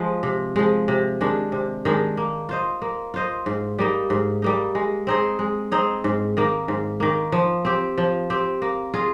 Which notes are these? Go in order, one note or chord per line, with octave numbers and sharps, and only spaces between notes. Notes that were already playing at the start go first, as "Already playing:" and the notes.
Already playing: F3 G#3
C3
F3 G#3
C3
D#3 G#3 D4
C3
D#3 G#3 D4
A#3
F4 C5 D#5
A#3
F4 C5 D#5
G#2
G3 A#3 D#4
G#2
G3 A#3 D#4
G#3
C4 D#4 G#4
G#3
C4 D#4 G#4
G#2
D#3 A#3
G#2
D#3 A#3
F3
C4 G4
F3
C4 G4
A#3
F4 G#4 D#5